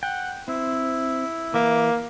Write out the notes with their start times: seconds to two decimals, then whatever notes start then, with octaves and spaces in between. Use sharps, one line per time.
0.03 F#5 G5
0.48 C4 E4
1.54 E3 A#3 E5